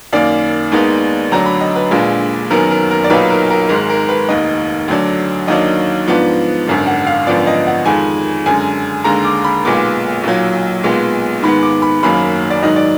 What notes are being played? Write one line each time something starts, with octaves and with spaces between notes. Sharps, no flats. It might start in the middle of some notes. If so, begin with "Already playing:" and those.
F#2 D#3 A#3 D5
D#2 D#3 G#3 B3 D#4
D2 D3 F#3 D4 A#5
B5
D#5
B4
A#1 A#2 G#3 D4
F#1 F#2 D#3 F#3 B3 A#4
A#4
A#4
D5
B1 A#2 F#3 A#3 D#4 B4
A#4
A#4
G#1 G#2 D#3 G#3 A#4
A#4
B4
F1 D#2 D#3 D#5
D2 D3 F#3 D4
D#2 D#3 F#3 D4 D#5
G#2 F3 B3 D4
G#1 F#2 D3
F#5
F5
G#1 F#2 D3 F3 B3 D5
D#5
F#5
F2 D#3 G#3 G#5
F#2 D3 G#3 G#5
D#2 D3 G#3 A#5
D6
B5
B1 A#2 G#3 B3 D6
B1 A#2 F#3
B1 A#2 G#3 B3
G#2 D#3 G#3 B3 B5
D6
B5
F#1 F#2 D#3 F#3 A#3 B5
D5
G#2 D#3 F#3 D#5
D5